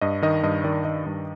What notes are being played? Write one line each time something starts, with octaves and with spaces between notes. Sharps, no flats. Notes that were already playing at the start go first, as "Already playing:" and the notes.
G2 D#5
D#3 D#5
G2 D#5
D#3 D5
D#3 D#5
G2